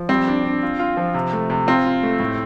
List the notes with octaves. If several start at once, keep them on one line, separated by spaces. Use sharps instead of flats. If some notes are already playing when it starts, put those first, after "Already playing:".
Already playing: F3
G3 C4
D4
D4
F4
F4
F3
C3
A3
C3
C4 F4
F4
A3
A2